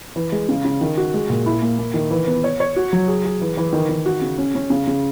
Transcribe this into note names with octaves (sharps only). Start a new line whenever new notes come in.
E3
G#3
C#3
C#3
D#3
F#4
G#3
A#2
E4
A#3
A#3
D#3
E3
B3
C#5
C#5
F#4
F#3
G#4
G#4
E3
E3
D#3
D#3
F#4
C#3
C#4
C#4
C#3
C#3